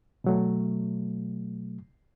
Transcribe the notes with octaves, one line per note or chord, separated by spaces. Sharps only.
B2 F#3 A3